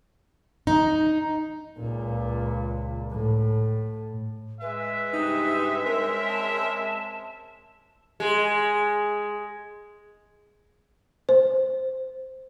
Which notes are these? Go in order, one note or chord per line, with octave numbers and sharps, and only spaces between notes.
D#4
C#2 A#2
A2
G#3 B4 E5
G2 C3 D#4
C4 C#4 A#4
A5
G#3
C5